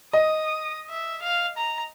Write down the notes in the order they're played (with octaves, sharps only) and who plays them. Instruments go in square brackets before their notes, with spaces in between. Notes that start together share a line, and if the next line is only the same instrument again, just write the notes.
[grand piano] D#5 [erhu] D#6
[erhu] E5
F5
A#5